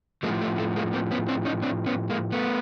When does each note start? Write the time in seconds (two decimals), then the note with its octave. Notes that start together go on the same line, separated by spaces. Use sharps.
0.23 F3 G#3 A#3
0.28 A2
0.42 A3
0.58 A3
0.76 G#3 A#3
0.93 A#3 C4
1.11 B3 C#4
1.28 C4 D4
1.45 C#4 D#4
1.62 C4 D4
1.86 B3 C#4
2.10 G#3 A#3
2.32 A3 B3